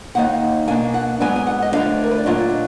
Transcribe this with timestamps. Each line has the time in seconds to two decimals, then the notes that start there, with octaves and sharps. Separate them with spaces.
0.15 D#2 D#3 A#3 D#4 F#5
0.67 B2 A#3 D4 G#5
0.94 F#5
1.20 G#2 F#3 B3 D4 G#5
1.36 G#5
1.47 F#5
1.62 D#5
1.74 D2 D3 F#3 D4 F5
2.04 A#4
2.11 B4
2.18 D5
2.26 A#2 F#3 D4 F4 D#5